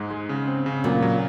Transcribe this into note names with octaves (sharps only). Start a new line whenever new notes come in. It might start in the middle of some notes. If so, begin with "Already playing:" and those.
Already playing: G#2 G#3
G#3
C#3
C4
C#3
A#2 F#3 A#3
F#3